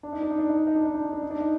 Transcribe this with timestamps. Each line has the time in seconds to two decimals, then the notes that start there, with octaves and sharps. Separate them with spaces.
0.03 D4
0.13 D#4
0.22 D4
0.31 D#4
0.39 D4
0.49 D#4
0.58 D4
0.67 D#4
0.76 D4
0.86 D#4
0.95 D4
1.04 D#4
1.13 D4
1.22 D#4
1.31 D4
1.40 D#4